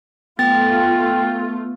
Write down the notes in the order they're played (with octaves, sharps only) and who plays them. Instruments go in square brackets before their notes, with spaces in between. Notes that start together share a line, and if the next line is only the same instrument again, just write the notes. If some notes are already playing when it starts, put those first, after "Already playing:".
[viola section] A3 F4 [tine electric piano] B3 [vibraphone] G5 [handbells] A6